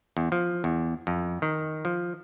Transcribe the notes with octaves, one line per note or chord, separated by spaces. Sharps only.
E2
F3
E2
F2
D#3
F3